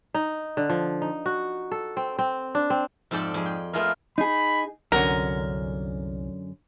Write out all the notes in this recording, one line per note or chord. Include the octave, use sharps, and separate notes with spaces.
D#4
D3
F3
D#4
F#4
A4
C4
C4
D4
C4
F2 G#2 A4 D5 G5 A5
F2 G#4
G5
A3 B3 F4 G#4 A#4
D#4 G#4 B5
C2 F#2 D3 C#4 A#4